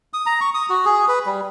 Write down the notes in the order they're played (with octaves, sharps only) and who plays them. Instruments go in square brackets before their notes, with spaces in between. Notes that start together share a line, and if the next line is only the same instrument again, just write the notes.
[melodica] D#6
A#5
C#6
D#6
F#4
G#4
B4
G3